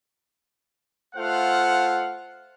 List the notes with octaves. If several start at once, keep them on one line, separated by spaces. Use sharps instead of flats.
A3 F4 C5 F5 F#5